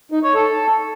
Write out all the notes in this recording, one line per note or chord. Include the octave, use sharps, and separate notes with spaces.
D#4
C#5
A4